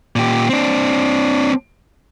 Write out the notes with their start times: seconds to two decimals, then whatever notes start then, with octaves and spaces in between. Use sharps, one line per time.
0.16 A#2 G4
0.49 C4 D4